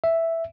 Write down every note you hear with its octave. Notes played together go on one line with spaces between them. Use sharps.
E5